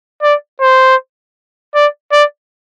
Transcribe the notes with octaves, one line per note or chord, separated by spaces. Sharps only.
D5
C5
D5
D5